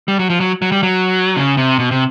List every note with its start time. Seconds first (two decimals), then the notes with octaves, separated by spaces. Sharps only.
0.08 G3
0.19 F#3
0.30 F3
0.40 F#3
0.62 F#3
0.72 G3
0.83 F#3
1.36 C#3
1.57 C3
1.79 B2
1.91 C3